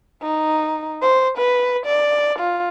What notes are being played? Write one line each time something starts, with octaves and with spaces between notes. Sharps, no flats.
D#4
C5
B4
D5
F4